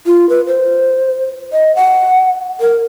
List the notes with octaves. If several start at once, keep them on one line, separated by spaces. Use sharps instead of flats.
F4
B4
C5
D#5
F#5
A#4